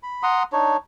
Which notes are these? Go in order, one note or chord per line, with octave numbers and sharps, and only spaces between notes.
B5
F#5 A#5 C6 D#6
D4 D#4 C#5